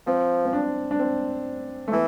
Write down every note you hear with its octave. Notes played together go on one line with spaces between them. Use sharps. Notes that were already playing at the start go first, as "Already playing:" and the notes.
F3 C4
C4
D4
D4
C4
A3
E3 B3